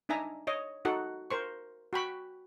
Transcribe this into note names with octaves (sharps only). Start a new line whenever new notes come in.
D4 D#4 E5 G#5 A#5
C#5 D#5
D#4 F#4 A4 F#5
A#4 C5 C#6
F#4 G5 B5 C#6